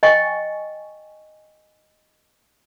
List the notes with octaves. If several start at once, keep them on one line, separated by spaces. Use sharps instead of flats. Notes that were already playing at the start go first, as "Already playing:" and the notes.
D#5 G5 G#5 C#6